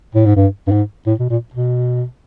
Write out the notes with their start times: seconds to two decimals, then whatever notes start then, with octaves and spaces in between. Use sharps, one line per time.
0.15 A2
0.26 G#2
0.36 G2
0.67 G2
0.71 G#2
1.06 A2
1.20 B2
1.30 A#2
1.54 B2